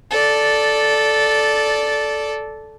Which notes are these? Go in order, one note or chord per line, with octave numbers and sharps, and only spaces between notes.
A4 D5